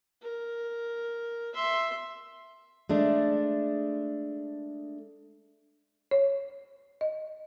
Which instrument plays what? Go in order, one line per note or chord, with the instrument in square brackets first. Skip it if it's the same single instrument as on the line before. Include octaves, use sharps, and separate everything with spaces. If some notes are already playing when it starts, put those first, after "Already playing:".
[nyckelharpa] A#4
E5 C6
[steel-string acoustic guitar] G#3 A3 D4
[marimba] C#5
D#5